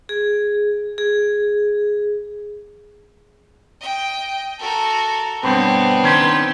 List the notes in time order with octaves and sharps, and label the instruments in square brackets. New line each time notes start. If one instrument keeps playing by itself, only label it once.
[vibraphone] G#4
G#4
[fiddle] D#5 G5
[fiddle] F#4 A#4 [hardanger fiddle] A4
[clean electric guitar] G2 B2 [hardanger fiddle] B3 D4 [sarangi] C4 [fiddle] C#5
[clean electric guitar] D#3 C#4 C5 [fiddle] B4 C6